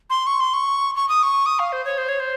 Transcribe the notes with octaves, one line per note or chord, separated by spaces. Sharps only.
C6
C#6
C6
C#6
C#6
D#6
C#6
D#6
F5
C5
C#5
C5
C#5
C5